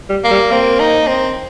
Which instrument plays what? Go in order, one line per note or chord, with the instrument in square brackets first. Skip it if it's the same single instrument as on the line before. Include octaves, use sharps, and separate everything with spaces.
[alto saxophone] G3
[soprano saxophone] A#3
[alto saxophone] G3
[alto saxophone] A#3 [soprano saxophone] C4
[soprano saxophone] D#4
C4